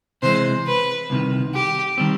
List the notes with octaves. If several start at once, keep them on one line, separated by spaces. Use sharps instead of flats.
C3 E3 G#3 C5
B4
C2 C3 D#3
G4
D#3 G3 C4